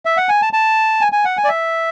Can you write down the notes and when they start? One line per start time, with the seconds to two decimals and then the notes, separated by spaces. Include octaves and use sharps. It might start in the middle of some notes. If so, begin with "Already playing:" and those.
0.05 E5
0.17 F#5
0.29 G#5
0.42 A5
0.53 A5
1.01 G#5
1.12 G#5
1.25 F#5
1.37 G#5
1.44 D5
1.48 E5